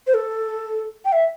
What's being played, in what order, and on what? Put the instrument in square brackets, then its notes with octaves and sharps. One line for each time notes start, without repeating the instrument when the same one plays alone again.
[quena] C5
A4
G5
E5